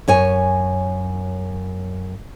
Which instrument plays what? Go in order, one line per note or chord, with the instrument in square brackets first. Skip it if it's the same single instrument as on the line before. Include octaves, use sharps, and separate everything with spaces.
[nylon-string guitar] F#2 C#5 G#5